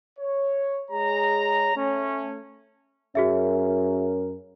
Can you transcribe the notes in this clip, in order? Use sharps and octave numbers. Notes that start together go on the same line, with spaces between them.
C#5
G#3 G#4 C#5 A#5
A3 C#4
F#2 C#4 F#4 G#4 A#4 E5